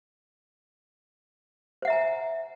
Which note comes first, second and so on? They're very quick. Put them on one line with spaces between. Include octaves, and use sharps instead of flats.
C5 F#5 E5 A#5 G#5